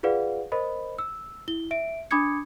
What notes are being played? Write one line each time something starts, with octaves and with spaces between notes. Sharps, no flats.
F4 G#4 B4 D5 F5 F#5
A#4 C5 D#5 B5
E6
E4 G7
E5 D7
D4 B5 D6 D#6 G#6 C#7